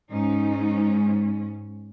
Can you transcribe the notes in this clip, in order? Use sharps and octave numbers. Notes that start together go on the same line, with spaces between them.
G#2 G#3 C#4 D#4